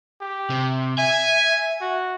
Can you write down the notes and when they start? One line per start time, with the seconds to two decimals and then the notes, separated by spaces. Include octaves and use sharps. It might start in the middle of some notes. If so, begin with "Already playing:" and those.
0.21 G4
0.50 C3
0.98 E5 G#5
1.81 F#4